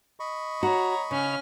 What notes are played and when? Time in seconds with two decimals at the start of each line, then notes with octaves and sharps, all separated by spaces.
0.20 D#5 B5 C#6
0.63 F#4 C#5 A#5
1.11 C#3 C#4 F6